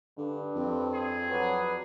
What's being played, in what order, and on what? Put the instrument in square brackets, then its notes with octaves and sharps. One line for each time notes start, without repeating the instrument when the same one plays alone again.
[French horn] G2 [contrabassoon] D3
[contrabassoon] F2 [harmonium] C4
[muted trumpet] G#4
[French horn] F#3 [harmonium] D4 B4